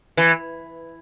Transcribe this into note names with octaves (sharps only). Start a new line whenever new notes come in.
E3